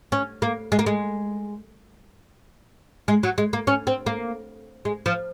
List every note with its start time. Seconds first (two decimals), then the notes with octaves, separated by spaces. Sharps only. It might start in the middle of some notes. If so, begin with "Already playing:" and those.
0.12 C#4
0.42 A#3
0.72 G#3
0.79 A#3
0.86 G#3
3.08 G#3
3.23 F#3
3.38 G#3
3.53 A#3
3.67 C#4
3.87 C4
4.06 A#3
4.85 G#3
5.06 F3